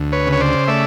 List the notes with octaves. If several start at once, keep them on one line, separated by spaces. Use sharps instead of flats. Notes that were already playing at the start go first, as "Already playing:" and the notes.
Already playing: D2
B4 C#5
C#3
C#5
C5 D5
A3 D5 E5